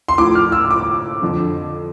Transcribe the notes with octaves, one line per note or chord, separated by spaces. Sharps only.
C6
A2 F3 D6
F6
E6
D6
F2 D3 F3